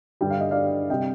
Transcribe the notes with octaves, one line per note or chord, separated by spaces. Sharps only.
G2 D3 G3 G5
F5
D#5
D5 F5
C3 G3 D#5 G5